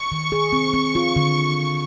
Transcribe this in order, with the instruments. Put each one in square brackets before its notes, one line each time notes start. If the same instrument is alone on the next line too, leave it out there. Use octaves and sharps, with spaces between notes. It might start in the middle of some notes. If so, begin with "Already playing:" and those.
Already playing: [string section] C#6
[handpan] D#3
G#4
C4
C4
F4
D3